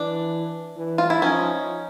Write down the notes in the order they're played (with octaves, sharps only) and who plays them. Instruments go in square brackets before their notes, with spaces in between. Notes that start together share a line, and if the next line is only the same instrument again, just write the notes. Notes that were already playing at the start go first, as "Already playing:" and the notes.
Already playing: [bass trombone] E3 [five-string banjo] D4
[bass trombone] E3
[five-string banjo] F4
E4
[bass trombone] F3 [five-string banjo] C#4 D#4